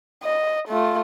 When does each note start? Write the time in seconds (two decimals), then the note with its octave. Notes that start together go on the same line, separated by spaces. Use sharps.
0.23 D#5
0.68 A3 F4